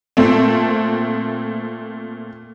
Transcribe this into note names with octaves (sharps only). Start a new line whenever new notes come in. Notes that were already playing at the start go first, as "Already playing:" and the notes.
A#2 A3 C4